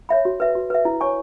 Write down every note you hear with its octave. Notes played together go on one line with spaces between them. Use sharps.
C#5 E5 B5
F#4
B4 E5
F#4
B4 E5
E4
C#5 G#5 C#6